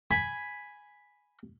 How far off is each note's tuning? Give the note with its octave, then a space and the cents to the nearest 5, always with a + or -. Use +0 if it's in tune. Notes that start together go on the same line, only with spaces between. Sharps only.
G#5 +0 B5 +0